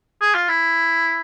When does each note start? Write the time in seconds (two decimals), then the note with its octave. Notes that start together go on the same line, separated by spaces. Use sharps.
0.21 G#4
0.34 F4
0.48 E4